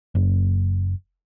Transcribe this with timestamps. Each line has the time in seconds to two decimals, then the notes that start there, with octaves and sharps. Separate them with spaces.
0.15 F#1